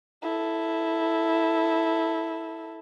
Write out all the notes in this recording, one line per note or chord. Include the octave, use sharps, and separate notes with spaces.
E4 A4